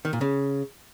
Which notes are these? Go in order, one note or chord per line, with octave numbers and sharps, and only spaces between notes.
D#3
A#2
C#3